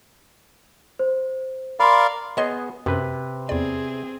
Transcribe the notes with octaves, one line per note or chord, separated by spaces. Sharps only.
C5
A#4 D5 F5 B5 C6
B3 G#4 C#5 D#5 C6
F#2 C3 B4
E2 C4 G#4 D5